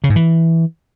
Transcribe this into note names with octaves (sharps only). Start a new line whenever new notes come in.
C#3
G#2
E3